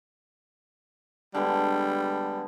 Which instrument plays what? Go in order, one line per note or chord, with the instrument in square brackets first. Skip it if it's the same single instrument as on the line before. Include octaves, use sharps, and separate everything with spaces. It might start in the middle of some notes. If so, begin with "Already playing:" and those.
[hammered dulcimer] D3 G#3 B3 [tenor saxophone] G3